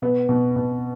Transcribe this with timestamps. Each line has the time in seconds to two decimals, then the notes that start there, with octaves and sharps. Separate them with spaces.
0.02 B2 B3
0.29 B2
0.56 B2